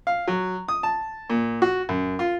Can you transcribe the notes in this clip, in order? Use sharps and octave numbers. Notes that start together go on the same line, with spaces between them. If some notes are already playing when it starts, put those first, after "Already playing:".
F5
F#3
D#6
A5
A#2
F#4
F#2
F4